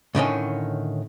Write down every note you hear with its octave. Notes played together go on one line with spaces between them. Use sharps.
A2 D3 D#3 C#4